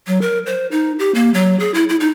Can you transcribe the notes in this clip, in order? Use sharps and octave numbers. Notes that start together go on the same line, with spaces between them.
F#3
A#4
C5
D#4
G4
A#3
F#3
G#4
E4
E4
D#4